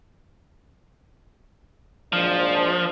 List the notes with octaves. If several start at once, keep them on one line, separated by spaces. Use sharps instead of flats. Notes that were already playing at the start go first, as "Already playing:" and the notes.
G#1 A#2 F3 D4